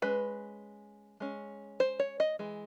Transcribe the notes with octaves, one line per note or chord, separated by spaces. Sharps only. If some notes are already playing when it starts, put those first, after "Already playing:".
G#3 C#4 B4
G#3 C#4
C5
C#5
D#5
E3 G#3